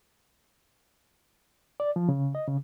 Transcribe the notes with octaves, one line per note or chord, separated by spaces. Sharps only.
D5
F3
C#3
D#5
C#3